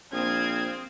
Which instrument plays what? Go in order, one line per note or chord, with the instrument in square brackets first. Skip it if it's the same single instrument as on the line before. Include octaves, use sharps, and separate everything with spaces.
[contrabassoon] A#1 [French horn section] C4 [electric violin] F5 D#6 [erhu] G#6